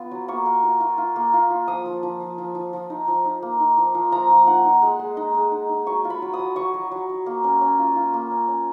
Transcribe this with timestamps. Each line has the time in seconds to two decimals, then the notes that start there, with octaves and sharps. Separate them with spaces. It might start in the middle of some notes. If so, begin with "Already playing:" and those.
Already playing: B3 F4
0.11 F#3
0.28 A#3 C#6
0.46 A#3
0.63 F4
0.81 F4
0.98 F4
1.16 A#3
1.34 F4
1.50 F4
1.68 F3 D#6
1.86 F3
2.03 F3
2.20 F3
2.38 F3
2.55 F3
2.73 F3
2.90 D#4
3.08 F3
3.25 D#4
3.42 A#3
3.60 D#4
3.78 F3
3.95 F3
4.12 F3 A#5
4.30 F3
4.47 D#4 F#5
4.65 D#4
4.82 G#3
4.99 G#3
5.17 D#4
5.34 G#3
5.52 D#4
5.69 D#4
5.87 F#3 C#6
6.05 F4
6.10 B5
6.22 F#3
6.33 D#6
6.39 F#3
6.56 F#3 C#6
6.74 F#3
6.91 F#3
7.09 F#3
7.26 A#3
7.44 C#4
7.61 C#4
7.79 F4
7.96 F4
8.14 A#3
8.31 C#4
8.48 C#4